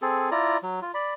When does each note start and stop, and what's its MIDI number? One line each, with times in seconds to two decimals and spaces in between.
0.02 0.30 60
0.02 0.30 68
0.02 0.30 69
0.31 0.57 64
0.31 0.57 65
0.31 0.57 74
0.31 0.57 82
0.63 0.80 54
0.82 0.92 65
0.94 1.14 74
0.94 1.14 83